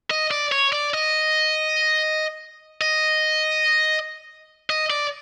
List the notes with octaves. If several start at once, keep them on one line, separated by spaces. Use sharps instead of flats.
D#5
D5
C#5
D5
D#5
D#5
D#5
D5